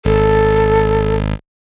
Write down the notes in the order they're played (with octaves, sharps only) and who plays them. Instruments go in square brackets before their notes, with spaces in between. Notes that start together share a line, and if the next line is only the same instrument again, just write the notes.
[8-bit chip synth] G#1 [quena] A4